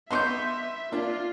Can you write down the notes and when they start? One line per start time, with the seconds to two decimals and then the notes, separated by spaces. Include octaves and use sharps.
0.11 B3 D#5 E5 C6 C#6 G6
0.92 A#3 D4 F4